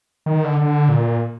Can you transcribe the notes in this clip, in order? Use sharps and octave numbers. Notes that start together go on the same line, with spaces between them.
D#3
D3
D3
A#2